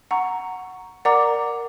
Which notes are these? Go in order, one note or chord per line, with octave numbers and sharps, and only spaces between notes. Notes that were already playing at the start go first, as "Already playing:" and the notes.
F#5 A#5 C#6
A#4 D5 F#5 A#5 D6